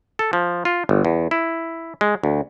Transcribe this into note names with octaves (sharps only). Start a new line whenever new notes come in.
A4
F3
F4
G1
E2
E4
G#3
D2